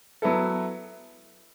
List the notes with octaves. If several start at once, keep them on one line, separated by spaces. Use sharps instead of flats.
F#3 B3 E4 A4